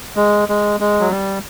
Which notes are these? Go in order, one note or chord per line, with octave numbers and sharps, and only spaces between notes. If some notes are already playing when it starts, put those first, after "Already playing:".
G#3
G#3
G#3
F#3
G3